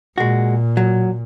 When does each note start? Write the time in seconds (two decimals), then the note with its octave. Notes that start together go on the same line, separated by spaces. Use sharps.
0.18 A#2 G#3 F#4
0.77 F#3